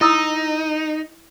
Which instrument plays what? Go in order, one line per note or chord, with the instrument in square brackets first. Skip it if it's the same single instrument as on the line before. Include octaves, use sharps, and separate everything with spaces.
[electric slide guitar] D#4 [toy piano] E4 D#6 E6